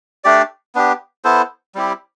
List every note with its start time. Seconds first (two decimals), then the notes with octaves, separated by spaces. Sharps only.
0.24 A3 D4 G4 D5
0.75 B3 D4 G4
1.24 B3 E4 A4 C5
1.75 G3 C4 E4 G4